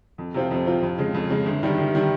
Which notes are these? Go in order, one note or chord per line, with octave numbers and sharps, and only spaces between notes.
F2
C3 F3 C4 F4
F2
C3 F3 C4 F4
F2
C#3 G#3
F2
C#3 G#3
G1
G2 D#3 G3
G1
D#3 G3